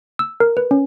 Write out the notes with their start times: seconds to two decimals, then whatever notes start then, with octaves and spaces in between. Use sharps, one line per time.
0.19 E6
0.40 A#4
0.57 B4
0.71 C#4